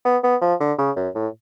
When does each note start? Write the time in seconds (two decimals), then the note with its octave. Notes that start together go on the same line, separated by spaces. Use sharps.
0.05 B3
0.23 B3
0.41 F3
0.60 D3
0.78 C#3
0.96 F#2
1.15 A2